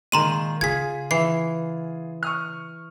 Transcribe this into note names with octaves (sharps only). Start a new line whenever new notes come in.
A#2 D#3 G#3 A#5 C6 D#7
C#3 F4 G#4 G#6 B6
E3 C7
C#6 D#6 F6